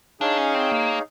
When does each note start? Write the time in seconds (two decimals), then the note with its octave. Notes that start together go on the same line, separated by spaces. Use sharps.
0.21 D4 D#4 G#4 C#5 F5
0.38 C#4
0.55 C4
0.72 A#3